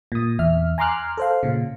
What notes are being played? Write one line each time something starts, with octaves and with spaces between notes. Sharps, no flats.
A#2 D#6
E2 E5 F6
G#5 A#5 C6 D6 F6 F#6
A4 C5 F5
A#2 C#3